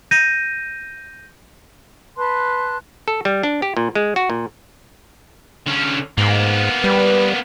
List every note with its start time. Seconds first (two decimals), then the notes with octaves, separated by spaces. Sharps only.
0.11 G6 A#6 D#7
2.17 B4 A5 C6 F#6
3.08 A4
3.25 G3
3.43 D4
3.62 G4
3.77 A#2
3.95 G#3
4.16 F#4
4.30 A#2
5.66 D3 C#4
6.18 G#2 A#3 B3
6.84 G3 B4